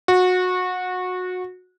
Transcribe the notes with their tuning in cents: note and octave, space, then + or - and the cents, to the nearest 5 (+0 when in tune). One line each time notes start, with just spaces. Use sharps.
F#4 -20